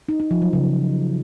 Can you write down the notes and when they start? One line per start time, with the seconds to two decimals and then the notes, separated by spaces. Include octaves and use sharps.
0.09 D#4
0.20 D#4
0.31 F3
0.42 F#3
0.53 C#3